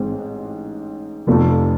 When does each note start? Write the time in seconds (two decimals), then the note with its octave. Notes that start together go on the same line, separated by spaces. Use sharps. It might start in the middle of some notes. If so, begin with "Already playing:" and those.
Already playing: A1 G#2 G#3 C4
1.27 F1 F2 C3 F3 A3